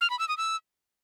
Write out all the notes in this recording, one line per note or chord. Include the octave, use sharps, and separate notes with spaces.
F6
B5
E6
D#6
E6